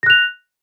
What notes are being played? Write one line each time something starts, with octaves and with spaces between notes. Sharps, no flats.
F#6 A#6 F7